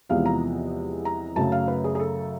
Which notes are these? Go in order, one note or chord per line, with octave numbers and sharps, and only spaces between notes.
E2 C3 F3 G#3 B3 F5
A#5
A#5
F#2 C#3 F#3 A3 A5
F5
B4
G#4
G#4
A4